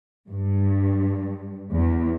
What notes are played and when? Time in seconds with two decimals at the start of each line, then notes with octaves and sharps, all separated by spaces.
0.30 G2
1.73 E2